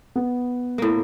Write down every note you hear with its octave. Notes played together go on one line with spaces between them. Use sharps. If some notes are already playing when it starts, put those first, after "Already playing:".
B3
A2 A#3